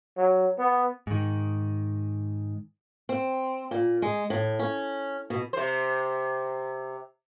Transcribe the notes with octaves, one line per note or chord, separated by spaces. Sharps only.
F#3
B3
G#2 D#3
C4
A#2
G#3
A2
C#4
B2
C3 C5